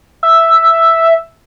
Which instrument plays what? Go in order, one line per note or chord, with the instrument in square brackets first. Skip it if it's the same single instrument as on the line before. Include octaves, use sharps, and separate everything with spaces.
[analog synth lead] E5